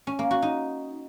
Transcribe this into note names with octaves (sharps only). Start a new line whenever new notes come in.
C#4
A#3
F#4
D#4